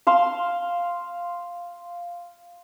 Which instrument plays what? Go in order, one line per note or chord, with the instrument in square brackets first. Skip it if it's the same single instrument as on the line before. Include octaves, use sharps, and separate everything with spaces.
[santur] F5 C6 E6